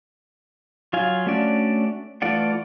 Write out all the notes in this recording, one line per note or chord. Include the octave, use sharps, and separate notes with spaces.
F#3 F4 F5 G#5
A3 C#4 D4 F#4 D5
E3 A3 F4 D5 F#5